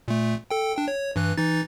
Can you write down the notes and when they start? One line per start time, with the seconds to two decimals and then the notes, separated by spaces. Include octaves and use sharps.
0.08 A#2 A3
0.51 A4 G5
0.76 D4 G5
0.88 C#5
1.16 G2 E3 F#6
1.37 E3 D#4 A6